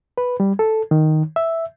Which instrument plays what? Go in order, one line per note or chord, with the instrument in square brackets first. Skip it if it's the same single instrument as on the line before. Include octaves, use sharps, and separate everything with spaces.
[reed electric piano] B4
G3
A4
D#3
E5